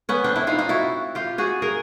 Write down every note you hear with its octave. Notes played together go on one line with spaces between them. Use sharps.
B3 C#4
C4 D4
D4 E4
D#4 F4
D#4 F4
E4 F#4
F4 G4
F#4 G#4
G#4 A#4